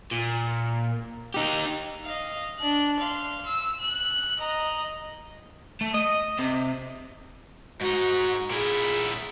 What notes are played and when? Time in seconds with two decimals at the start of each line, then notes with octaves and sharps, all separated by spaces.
0.12 A#2
1.34 D#4 G4
2.04 D#5 F5
2.60 D4 F#6
3.00 F5 C6
3.46 E6
3.80 F#6
4.39 D#5 A#5
5.81 A3
5.94 D#5
6.39 C3
7.81 G#2 D#4 F#4
8.50 A#2 E4 G#4